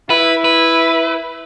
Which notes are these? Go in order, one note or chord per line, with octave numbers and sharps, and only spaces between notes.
E4 B4
B4